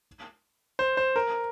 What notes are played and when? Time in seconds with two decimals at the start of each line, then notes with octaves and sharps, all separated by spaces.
0.79 C5
0.97 C5
1.16 A#4